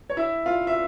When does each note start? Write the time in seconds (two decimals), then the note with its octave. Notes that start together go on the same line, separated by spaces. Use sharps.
0.10 C#5
0.17 E4 E5
0.46 F4 F5
0.67 E5